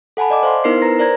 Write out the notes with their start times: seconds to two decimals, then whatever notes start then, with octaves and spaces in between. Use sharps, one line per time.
0.17 A4 F#5 G#5 A5 B5
0.30 D5 D#5 D6
0.43 C5 F5 C6
0.64 B3 D#4 E4 A#4 C5 C7
0.82 B4 A#5 A#6
0.99 A#4 C5 D5 A#5 G#6 A#6